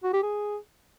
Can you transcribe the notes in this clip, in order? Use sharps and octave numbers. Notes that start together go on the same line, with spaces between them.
F#4
G4
G#4